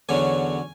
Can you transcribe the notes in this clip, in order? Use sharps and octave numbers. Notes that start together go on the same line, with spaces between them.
E2 D3 F#3 C#4 G#5